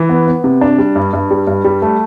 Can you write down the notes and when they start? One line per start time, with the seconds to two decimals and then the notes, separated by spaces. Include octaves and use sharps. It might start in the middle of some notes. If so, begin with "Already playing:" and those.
Already playing: E3
0.09 B3
0.27 B3
0.44 C3
0.61 D4
0.78 G3
0.95 G2
1.13 G2
1.31 G3
1.47 G2
1.64 G3
1.82 A3